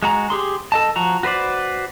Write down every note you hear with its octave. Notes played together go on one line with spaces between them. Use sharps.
G#3 F#4 A#5
G4 G#4 C6
A4 D#5 A5
F3 F#4 A#5
F#4 B4 C5 D5